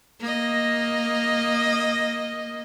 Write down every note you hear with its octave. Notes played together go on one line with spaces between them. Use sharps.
A#3 D#5